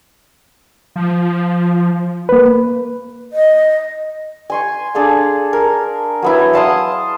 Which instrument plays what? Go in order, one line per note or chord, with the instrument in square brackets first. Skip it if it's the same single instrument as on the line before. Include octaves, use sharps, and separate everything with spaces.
[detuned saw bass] F3
[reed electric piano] A#3 B4
[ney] D#5
[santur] G#5 C6 C#6
D4 G#4 A4 F5
A#4
F#3 B3 E4
F5 A5 C6 D#6